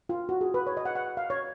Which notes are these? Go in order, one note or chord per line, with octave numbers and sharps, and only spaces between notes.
F4
F#4
G#4
B4
C#5
D#5
F#5
F#5
F5
C#5